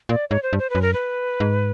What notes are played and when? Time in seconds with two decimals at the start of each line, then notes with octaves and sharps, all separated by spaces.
0.09 A#2 D5
0.30 G#2 C#5
0.43 C5
0.53 G2
0.59 C5
0.70 F#2 B4
0.82 A#4
0.94 B4
1.40 G#2